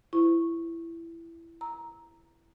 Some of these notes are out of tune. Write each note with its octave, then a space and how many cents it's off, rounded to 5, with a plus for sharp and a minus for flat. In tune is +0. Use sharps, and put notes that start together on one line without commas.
E4 +15 C5 -40 C#6 -10
A#5 +0 E6 -15